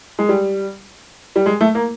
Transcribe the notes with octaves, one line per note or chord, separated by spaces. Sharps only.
G#3
G3
G3
G#3
A3
A#3